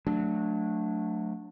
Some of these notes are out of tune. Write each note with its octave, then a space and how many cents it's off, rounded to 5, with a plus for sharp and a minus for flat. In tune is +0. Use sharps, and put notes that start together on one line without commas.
F#3 -20 A3 +0 D4 +0